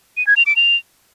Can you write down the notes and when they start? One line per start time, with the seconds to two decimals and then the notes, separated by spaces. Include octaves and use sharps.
0.17 D#7
0.27 G#6
0.37 F7
0.46 D7
0.56 F7